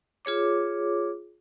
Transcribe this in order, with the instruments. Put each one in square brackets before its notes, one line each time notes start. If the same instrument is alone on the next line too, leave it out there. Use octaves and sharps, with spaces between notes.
[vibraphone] F4 G#4 C#5 D6